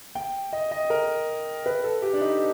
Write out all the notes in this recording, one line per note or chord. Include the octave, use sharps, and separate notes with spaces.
G5
D#5
D#5
A#4
B4
A4
G4
D4
D#4